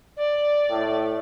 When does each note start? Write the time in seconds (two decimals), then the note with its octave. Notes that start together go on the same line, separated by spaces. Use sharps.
0.17 D5
0.70 A2